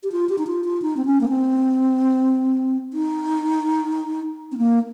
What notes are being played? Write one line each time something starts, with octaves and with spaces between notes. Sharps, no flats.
G4
F4
G4
D#4
F4
F4
D#4
C4
C#4
A#3
C4
D#4
C4
A#3